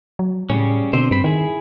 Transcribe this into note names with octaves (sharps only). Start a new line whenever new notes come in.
F#3
A2 C#3 G3 C#4
B2 D3 C4 C5
G2 C4 B5
D#3 E4 G#4